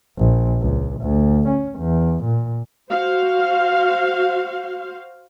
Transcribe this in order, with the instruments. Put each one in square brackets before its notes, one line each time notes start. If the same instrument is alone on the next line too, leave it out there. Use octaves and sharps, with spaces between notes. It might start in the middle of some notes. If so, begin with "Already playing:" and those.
[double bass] A#1
C#2
D2
C#4
E2
A#2
[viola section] F#4 C5 F5